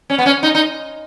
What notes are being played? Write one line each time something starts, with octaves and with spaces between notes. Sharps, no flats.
C#4
B3
C#4
D#4
D#4